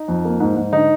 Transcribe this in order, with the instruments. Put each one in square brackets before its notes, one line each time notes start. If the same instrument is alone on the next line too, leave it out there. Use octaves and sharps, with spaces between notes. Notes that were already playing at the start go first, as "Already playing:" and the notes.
Already playing: [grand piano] D#4
F2
A#3
G#2
G#2
D3 D#4